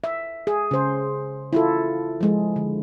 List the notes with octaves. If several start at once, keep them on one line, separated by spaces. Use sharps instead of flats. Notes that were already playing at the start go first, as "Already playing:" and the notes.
E5
G#4
C#3 C5
E4 F4 A4
F3 G#3
D3